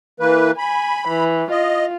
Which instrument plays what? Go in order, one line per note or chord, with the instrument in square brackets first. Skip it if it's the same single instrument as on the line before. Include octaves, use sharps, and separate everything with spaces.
[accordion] E3 A#3 B4
[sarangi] G#5 [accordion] B5
[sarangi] E3
[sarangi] F4 [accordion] D#5